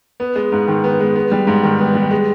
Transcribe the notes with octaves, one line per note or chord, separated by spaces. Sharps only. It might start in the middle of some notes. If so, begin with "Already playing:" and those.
B3
G#3
G#2
D#3
B3
G#3
B3
G3
G#2
D#3
B3
G3
G#3